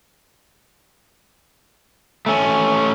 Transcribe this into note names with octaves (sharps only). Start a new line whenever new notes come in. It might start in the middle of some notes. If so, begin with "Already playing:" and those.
A3 C#4